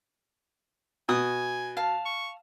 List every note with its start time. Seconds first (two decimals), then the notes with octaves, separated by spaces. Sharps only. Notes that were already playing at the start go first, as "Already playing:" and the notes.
1.09 B2 G#5 D#6
1.77 F5 A5
2.06 C#6